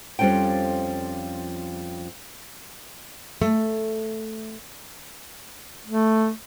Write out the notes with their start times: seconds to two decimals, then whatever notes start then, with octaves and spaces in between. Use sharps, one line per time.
0.19 F2 F3 G3 C#4 A4 G5
3.42 A3
5.86 A3